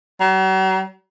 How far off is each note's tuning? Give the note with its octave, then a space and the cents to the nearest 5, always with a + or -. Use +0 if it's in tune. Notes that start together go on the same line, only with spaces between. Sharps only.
F#3 +45